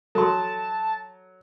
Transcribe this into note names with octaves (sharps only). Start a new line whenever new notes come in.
F#3 A4 A5 C6